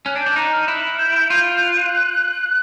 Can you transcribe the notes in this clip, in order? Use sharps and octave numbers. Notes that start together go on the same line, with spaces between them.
C#4 F#6
D4
G6
D4
D#4 F#6
F6
E4 F#6
G6
F4
F#6